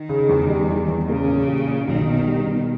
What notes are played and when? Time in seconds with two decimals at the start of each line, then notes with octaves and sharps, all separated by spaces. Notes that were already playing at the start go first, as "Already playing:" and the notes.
Already playing: D#3
0.09 C#3
0.29 E2
0.49 G3
0.69 E2
0.88 E2
1.08 C#3 A#3
1.28 A#2
1.48 G4
1.68 A#2
1.88 B1 D#3
2.07 B2
2.27 G3
2.47 B2